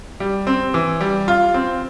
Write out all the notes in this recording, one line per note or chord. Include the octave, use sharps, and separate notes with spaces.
G3
C4
E3
G3
F4
C4